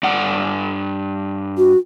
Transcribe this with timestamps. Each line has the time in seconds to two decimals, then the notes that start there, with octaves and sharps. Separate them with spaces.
0.03 G2 D5 F#5
1.58 F#4